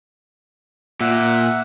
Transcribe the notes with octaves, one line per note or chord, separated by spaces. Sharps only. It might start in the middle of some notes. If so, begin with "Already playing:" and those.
A#2 E5 F#5